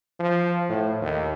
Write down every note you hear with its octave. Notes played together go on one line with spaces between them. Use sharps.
F3
A2
D#2